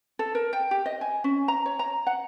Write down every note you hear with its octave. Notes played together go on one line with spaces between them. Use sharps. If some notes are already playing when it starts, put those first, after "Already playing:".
A4
A#4
G5
G4
D#5
G#5
C#4
A#5
C#5
A#5
F#5